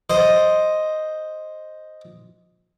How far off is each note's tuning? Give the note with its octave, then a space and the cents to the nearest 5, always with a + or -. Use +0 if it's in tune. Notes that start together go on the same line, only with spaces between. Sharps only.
C5 +0 D#5 +0